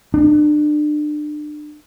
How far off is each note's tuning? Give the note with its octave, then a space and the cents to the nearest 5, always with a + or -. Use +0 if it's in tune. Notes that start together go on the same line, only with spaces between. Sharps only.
D4 +30